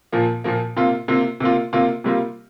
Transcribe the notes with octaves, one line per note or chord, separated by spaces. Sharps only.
A#2 F3 A#3
A#2 F3 A#3
C3 A#3 F4
C3 A#3 F4
C3 A#3 F4
C3 A#3 F4
C3 G3 A#3 F4